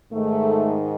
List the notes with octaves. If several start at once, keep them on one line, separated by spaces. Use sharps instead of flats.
G#2 D#3 G#3 A3